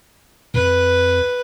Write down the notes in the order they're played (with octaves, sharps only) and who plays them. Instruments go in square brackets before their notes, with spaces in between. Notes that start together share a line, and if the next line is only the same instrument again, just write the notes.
[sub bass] F2 [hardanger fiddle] B4